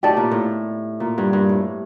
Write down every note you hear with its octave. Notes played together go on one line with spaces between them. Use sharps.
A2 D#4 G4 D5 A5
A#2
A2
A#2
G2
G2
A2